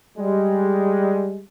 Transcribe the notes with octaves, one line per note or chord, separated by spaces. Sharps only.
G3 G#3